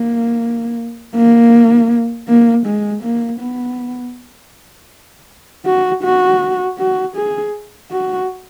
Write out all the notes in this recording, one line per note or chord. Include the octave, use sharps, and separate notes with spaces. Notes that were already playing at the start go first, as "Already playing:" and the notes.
Already playing: A#3
A#3
A#3
G#3
A#3
B3
F#4
F#4
F#4
G#4
F#4